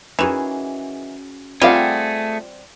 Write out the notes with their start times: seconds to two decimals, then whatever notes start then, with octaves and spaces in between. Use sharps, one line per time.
0.19 D#3 E3 C#4 F#4 G#4
1.62 G3 A3 C4 F4 G#4 F5 F#5